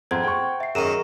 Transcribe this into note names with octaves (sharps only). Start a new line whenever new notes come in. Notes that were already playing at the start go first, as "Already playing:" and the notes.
F2 C5 F#5 A#5 C6 G#6
G5 C#6
E5 C7
F#2 D#3 G#4 A#5 C#6 D#7 E7